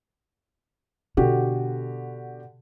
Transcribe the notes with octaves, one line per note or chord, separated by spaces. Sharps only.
B2 D3 F#4 G4